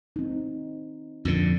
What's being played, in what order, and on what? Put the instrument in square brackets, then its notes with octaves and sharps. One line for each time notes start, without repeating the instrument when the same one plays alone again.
[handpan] C4 D#4
[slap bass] F2 A#2 D3 [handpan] D4